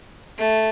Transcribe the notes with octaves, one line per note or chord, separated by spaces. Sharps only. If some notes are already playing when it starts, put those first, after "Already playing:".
A3